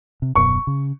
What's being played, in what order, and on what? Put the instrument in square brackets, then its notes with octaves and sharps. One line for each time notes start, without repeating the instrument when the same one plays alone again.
[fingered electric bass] C3
[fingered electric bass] D#1 F#2 B2 [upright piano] C#6
[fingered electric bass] C#3